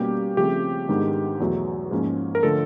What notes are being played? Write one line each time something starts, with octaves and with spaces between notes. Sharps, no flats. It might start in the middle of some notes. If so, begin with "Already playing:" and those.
Already playing: B2 G3 A#3 C#4 G4
C#3 F3 A3 C4 G4
G#2 D#3 G#3 B3 D4
E2 B2 F#3 A3
G#2 F3 A#3 C#4
A#4
D3 F3 A3 A4